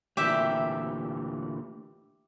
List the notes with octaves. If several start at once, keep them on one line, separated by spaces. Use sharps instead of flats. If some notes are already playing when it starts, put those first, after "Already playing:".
D2 A#2 E3 G4 E5